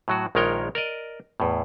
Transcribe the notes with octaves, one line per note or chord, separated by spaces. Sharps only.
A2 F#3 F#4
A#1 D#3 G#3 A#4 C#5 G5
A#4 D5 D#5
E2 A2